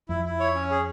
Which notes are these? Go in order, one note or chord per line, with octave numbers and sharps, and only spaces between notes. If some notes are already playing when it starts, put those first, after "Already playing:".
F2 E4
E4
C#5
C#4
G#4